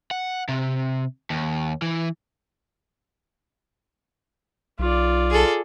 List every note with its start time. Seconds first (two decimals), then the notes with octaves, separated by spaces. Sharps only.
0.11 F#5
0.49 C3
1.30 D#2
1.82 E3
4.79 B1 F4 D5
5.30 G#4 A4